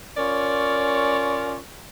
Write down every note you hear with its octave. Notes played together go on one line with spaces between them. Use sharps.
C#4 F4 A#4 C#5 D5